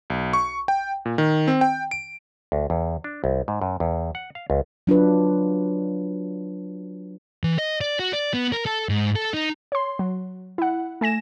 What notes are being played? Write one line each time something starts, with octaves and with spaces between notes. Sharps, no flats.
B1
C#6
G5
A#2
D#3
C4
G5
D7
D2
E2
D4
C2
G#2
F#2
E2
F#5
F5
C#2
F#3 D4 F4 B4
E3
D#5
D5
F#4
D5
B3
A#4
A4
G#2
A4
D#4
C#5 C6
F#3
E4 F#5
A3 G#5 A#6 E7